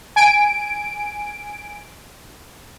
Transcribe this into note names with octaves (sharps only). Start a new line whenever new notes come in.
G#5 D7